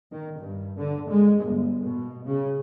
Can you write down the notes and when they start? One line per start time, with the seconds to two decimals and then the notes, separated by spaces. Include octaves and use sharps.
0.11 D#3
0.40 G2
0.77 D3
1.09 G#3
1.43 G1
1.83 B2
2.26 C#3